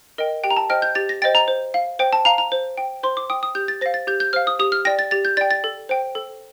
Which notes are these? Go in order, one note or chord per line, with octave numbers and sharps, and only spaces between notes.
A#4 D#5 G5
G4 G5
A#5
A5
C5 D#5 G5 F6
G6
G4 A6
A#6
C5 D#5 G5 A6
A#5
C5
F5
C5 G5
A5
F5 A#5
A#5
C5
G5
C5 C6
D6
G5 D#6
D#6
G4 G6
A6
C5 F5 A#6
A6
G4 G6
G6
C5 F5 F6
D#6
G4 D#6
F6
D5 G5 A#6
A6
G4 A6
G6
D5 G5 A6
A6
A4
C5 G5
A4